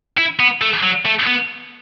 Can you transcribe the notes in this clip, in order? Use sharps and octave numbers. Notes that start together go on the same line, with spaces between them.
E4
B3
A3
F#3
A3
B3